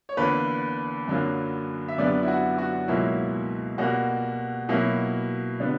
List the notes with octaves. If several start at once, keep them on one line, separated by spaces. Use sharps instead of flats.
C#5
E2 D3 A#3 B4
F#2 D3 F#3 A#3
E5
F#2 D3 G3 B3 D5
E4
F#4
F#4
C#2 B2 F#3 A#3 E4
B2 G3 A#3 F#4
B2 F#3 A#3 E4
D3 G3 B3